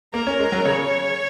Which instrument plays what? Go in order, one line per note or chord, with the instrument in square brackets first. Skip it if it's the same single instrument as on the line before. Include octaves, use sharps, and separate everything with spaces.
[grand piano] A#3 [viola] A#4
[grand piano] C#4
G#3
F#3
[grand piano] C#3 [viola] C#5